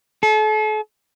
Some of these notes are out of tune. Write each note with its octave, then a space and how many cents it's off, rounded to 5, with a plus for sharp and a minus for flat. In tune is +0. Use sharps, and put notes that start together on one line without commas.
A4 -40